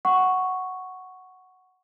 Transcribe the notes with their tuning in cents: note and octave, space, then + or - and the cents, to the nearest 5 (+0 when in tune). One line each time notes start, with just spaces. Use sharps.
F#5 +0 C#6 +0